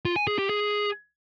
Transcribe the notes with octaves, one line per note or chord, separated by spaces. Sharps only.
F4
G#5
G#4
G4
G#4